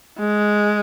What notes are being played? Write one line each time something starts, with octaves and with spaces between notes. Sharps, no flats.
G#3